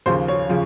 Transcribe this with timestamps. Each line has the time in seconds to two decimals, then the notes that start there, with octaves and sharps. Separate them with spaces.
0.06 D#2 C#3 F3 C5
0.28 C#5
0.49 C#3 F3